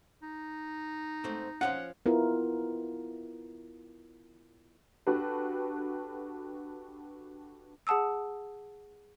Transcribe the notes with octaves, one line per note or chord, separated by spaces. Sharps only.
D#4
G#2 A3 C4
F3 C#4 F4 F#5
B3 E4 F4 A#4
D4 F#4 G4 A4 B4
G#4 F#5 A5 D#6 E6